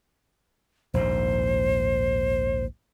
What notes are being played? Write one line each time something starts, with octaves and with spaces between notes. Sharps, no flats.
A#1 D#2 G#2 C5